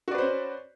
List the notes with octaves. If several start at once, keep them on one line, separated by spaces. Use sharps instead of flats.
C#4 F#4 B4 C5 D5